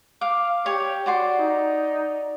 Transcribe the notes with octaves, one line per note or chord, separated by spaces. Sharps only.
F5 D6
G4 C#5
F#4 D5 C6
D#4